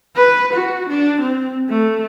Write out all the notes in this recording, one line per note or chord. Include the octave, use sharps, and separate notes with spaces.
B4
F#4
D4
C4
A3